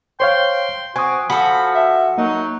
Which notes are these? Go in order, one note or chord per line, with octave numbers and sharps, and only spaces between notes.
C5 C#5 F5 G5 C6
C4 F#4 G#5 D#6
F3 F#4 A4 B5
E5
F#3 A#3 D#4